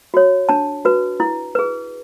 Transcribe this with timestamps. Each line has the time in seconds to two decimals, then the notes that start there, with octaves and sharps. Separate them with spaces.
0.14 F#4 C#5
0.49 D4 A5
0.85 F#4 B4
1.20 E4
1.55 G#4 B4